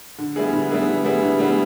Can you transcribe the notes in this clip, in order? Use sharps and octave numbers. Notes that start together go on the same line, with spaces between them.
D3
G3 B3 E4 G#4
D3
G3 B3 E4 G#4
D3
G3 B3 E4 G#4
D3
G3 B3 E4 G#4